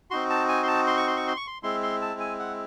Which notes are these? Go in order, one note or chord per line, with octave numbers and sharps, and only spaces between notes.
C4 D#4 F#4 C6
A5
G#5
C6
A5
C6
C#6
C6
C#6
C6
C#6
C6
G#3 C4 E4 C6
C6
A5
G#5
F#5